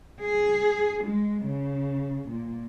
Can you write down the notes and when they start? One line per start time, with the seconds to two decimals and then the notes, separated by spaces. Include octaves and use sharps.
0.21 G#4
1.04 G#3
1.43 C#3
2.28 A#2